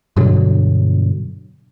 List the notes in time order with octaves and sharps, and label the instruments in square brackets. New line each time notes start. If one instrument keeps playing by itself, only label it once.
[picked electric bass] G2 B2 D3 F#3